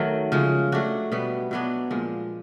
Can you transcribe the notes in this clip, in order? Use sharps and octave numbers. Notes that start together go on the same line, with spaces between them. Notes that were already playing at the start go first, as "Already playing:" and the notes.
Already playing: D#3 F#3 A3
C#3 F3 G#3
F#3 A3 D4 F#4
B2 G3 B3
B2 F#3 B3 D4
A#2 F3 G#3